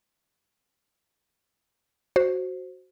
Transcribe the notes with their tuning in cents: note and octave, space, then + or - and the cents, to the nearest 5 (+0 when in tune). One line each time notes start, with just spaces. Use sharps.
F#4 +0 C5 +0